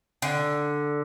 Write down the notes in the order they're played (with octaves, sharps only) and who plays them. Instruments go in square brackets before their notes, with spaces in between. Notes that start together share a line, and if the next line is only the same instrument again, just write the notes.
[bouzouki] D3